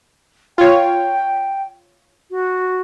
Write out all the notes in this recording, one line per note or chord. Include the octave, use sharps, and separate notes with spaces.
F4 C#5 G5
F#4